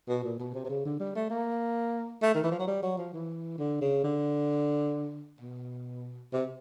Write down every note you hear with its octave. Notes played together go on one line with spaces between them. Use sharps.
B2
A#2
B2
C3
C3
C#3
D3
G3
A3
A#3
A3
D#3
E3
F3
F#3
G3
F#3
F3
E3
D3
C#3
D3
B2
C3